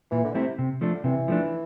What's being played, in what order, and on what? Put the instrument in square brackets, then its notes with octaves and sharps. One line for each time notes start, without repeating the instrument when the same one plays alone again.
[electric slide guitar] A#2 [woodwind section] E3
[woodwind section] D3
[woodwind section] C3 [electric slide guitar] A3 C4 E4
[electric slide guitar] C3
F3 A3 D4
[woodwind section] D3
[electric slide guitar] C3 [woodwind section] E3
[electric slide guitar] F3 A3 D4